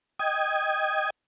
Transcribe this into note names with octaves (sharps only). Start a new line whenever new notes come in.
D#5 G5 D#6 G#6